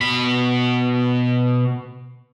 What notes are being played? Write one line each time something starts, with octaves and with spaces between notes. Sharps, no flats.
B2 B5